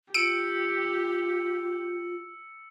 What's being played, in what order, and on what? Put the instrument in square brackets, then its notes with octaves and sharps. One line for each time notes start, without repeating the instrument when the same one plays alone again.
[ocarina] F4 [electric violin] G4 [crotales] E6 C#7 [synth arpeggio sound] D7